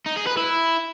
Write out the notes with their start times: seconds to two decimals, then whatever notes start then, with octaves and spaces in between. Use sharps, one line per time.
0.06 D#4
0.17 G#4
0.27 B4
0.37 E4